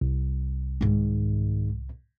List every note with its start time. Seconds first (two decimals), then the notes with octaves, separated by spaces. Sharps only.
0.01 C2
0.81 G#2 D#3